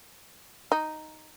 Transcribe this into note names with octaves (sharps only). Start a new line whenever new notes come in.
D#4